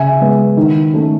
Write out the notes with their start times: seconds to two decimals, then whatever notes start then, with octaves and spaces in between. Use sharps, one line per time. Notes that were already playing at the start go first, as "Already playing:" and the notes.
Already playing: C#3 E5 G#5
0.20 G#3 B3
0.57 D#3
0.93 A3 C#4